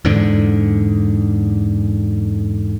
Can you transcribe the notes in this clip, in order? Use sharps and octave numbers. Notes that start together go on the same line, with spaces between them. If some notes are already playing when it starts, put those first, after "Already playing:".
E2 G#2 D3